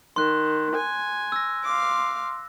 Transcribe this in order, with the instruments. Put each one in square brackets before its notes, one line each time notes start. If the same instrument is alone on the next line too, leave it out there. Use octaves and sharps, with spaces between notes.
[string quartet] D#3 [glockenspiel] C6 F#6
[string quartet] G#5
[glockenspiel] E6 A#6
[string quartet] F5 C6 D6